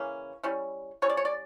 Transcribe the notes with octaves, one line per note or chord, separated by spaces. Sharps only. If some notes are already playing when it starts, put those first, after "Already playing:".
Already playing: C#3 E3 A#3 C#4
G3 C#4 E4
G3 C#4 E4 C#5
D5
C#5
D5